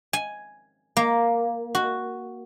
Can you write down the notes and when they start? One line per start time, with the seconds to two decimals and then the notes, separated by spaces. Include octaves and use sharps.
0.13 G#5
0.97 A#3
1.75 F#4